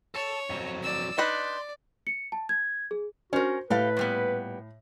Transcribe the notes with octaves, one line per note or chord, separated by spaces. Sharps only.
A4 C#5 A5
F2 F#3
D5 E6
D4 D#4 B4 D5 C6
C#7
A5
G#6
G#4
C#4 F#4 A#4 C5
A2 G4 A4 B4 F5
A#2 G3 B3